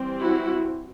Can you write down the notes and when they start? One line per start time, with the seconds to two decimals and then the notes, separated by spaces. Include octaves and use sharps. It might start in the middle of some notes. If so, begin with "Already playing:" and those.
Already playing: E3 G3 C4
0.20 E4 F#4